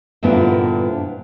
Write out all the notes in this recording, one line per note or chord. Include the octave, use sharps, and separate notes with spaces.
G2 A#2 D3 B3 C4 E4